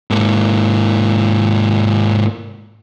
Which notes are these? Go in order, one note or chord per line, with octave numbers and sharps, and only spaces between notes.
G#2 A#3